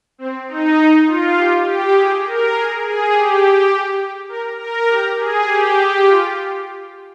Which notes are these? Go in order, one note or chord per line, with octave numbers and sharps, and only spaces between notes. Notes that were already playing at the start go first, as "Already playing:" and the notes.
C4
D#4
D#4
F4
G4
G4
G#4
A#4
G#4
G#4
G4
A#4
A#4
G4
G#4
G4
F4